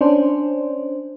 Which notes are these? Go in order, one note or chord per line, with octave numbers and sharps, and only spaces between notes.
C#4 D4 C5